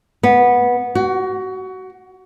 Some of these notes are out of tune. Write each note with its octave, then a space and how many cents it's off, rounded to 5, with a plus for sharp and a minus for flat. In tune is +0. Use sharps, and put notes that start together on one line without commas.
B3 -15
F#4 +25